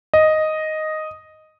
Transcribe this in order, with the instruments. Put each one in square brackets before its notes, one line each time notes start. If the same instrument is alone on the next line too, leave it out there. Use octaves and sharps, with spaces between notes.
[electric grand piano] D#5